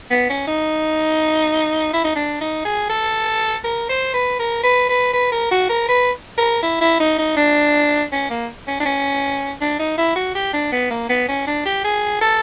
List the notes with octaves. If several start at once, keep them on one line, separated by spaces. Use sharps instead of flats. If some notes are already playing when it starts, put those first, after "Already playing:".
B3
C#4
D#4
E4
D#4
D4
D#4
G#4
A4
A#4
C5
B4
A#4
B4
B4
B4
A#4
F#4
A#4
B4
A#4
E4
E4
D#4
D#4
D4
C#4
A#3
C#4
D4
C#4
D4
D#4
E4
F#4
G4
D4
B3
A#3
B3
C#4
D4
G4
G#4
A4